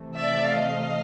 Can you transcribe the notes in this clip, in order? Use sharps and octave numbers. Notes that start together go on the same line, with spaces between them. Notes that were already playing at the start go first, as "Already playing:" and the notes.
Already playing: C3 E3 A3
D5 E5
D#5 F5